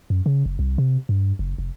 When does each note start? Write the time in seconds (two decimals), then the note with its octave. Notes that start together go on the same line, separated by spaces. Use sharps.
0.10 F#2
0.26 C#3
0.45 F#1
0.59 C2
0.78 C3
1.09 G2
1.39 F#1
1.58 F1